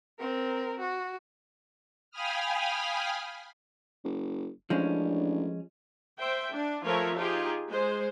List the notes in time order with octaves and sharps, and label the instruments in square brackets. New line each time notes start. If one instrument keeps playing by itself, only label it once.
[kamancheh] C4 A#4
F#4
[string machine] F5 G5 G#5 B5 D#6 F6
[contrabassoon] F#1
[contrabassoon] A1 [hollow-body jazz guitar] F3 G#3 C#4 [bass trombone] D4
[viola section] C5 E5 G5
D4
F3 A3 F4 A#4 C#5 E5
D#4 F4 G4 G#4
G#3 C5